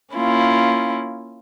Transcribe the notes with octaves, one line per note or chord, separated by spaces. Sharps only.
A#3 C#4 E4 F4